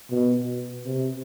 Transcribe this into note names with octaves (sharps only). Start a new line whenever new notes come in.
B2
C3